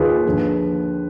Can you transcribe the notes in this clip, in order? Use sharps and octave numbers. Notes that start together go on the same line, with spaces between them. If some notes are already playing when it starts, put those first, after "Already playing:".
Already playing: D#2 D#3 D#4 F4 G#4 B4
D#2 D3 F3